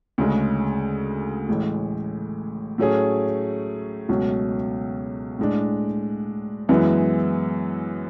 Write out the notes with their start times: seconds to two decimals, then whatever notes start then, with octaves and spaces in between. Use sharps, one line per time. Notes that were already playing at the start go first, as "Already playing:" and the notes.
0.18 D2 C#3 G#3
1.49 A1 A2 G#3
2.78 A2 F#3 A3 C#4 G#4
4.09 C#2 B2 F#3 A3 C#4
5.39 A2 G#3 D4
6.69 F#2 E3 G#3 B3 E4